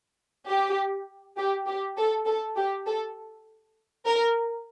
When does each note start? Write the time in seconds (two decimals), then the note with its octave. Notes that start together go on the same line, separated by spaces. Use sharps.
0.48 G4
1.37 G4
1.67 G4
1.97 A4
2.26 A4
2.57 G4
2.86 A4
4.06 A#4